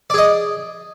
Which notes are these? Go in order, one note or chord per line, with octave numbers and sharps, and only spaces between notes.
G#4 D5 D#5